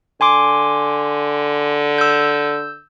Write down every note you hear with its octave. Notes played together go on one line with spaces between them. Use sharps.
D3 G#5 C6 D6
E6 G6